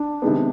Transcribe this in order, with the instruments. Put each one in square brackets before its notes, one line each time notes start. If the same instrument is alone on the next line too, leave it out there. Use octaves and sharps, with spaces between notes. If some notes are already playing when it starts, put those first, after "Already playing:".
Already playing: [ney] D4
[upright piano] C3 D#3 G#3 B3